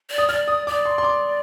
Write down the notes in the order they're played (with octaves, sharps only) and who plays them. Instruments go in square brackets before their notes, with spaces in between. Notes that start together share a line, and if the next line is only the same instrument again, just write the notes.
[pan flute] D5
[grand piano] D#6
[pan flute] D5 [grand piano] F6
[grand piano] D#6
[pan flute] D5 [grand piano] D6
[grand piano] C6
C6
D6